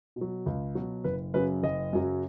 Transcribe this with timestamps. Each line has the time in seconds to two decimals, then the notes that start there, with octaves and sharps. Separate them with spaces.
0.16 B2
0.21 F#3
0.46 C#2
0.75 B2 F#3
1.04 F#1 B4
1.34 F#2 C#3 F#3 B4
1.63 F#1 D#5
1.93 F#2 C#3 F#3